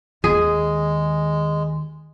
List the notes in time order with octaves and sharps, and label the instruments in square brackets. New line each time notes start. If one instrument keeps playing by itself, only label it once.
[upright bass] D#2 D#3 [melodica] G#3 [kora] G#4